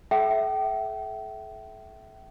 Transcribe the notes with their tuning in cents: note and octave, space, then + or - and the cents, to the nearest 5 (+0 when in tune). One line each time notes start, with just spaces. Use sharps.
A4 -45 E5 +0 G5 -35